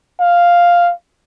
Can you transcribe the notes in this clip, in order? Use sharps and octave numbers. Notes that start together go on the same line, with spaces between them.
F5